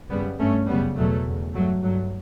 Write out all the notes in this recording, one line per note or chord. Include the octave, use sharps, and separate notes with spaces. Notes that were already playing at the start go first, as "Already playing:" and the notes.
F#2 C#3 G3 B3
G2 A3 C#4
F#2 G3 B3
C#3
E2 B2 F#3 A3
E2 C#3
G2 F#3 A3
G2 F#3 A3